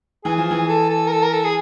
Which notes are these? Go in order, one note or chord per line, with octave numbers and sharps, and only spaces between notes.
E3 G#4
F3
E3
A4
A4
A#4
A4
A#4
A4
G#4